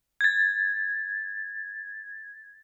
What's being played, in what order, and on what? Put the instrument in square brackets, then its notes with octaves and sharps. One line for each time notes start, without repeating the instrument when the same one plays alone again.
[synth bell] G#6 A6